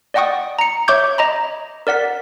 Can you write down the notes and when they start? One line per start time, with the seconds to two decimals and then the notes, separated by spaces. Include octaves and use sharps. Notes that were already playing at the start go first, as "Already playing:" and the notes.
0.14 D5 D#5 F#5 G5 C#6 D#6
0.59 A#5 C#7
0.88 C#5 E5 C#6 D6 G6 G#6
1.18 D#5 A#5 B5
1.87 A#4 D5 F#5 B6